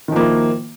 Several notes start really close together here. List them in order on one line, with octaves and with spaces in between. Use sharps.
D#3 F3 A#3 E4